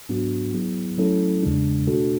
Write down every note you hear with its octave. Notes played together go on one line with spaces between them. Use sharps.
G#2 F#3 B3 D4 F#4
F#3 B3 E4 G#4
F#3 A3 C#4 E4 A4
E2 C#3 G#3 D4
B2 A3 D4 F#4 A4